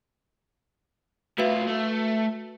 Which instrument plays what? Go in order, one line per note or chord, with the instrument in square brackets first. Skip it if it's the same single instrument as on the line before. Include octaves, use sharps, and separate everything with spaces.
[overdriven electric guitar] A2 F4 [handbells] F#4 B4 E5
[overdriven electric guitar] A3